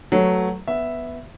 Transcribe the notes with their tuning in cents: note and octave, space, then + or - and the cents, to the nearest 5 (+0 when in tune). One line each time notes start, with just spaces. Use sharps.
F#3 +0 A3 +0 B4 +15
B3 +0 E5 +0